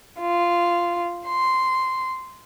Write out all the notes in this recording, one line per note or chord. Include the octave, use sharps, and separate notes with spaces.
F4
C6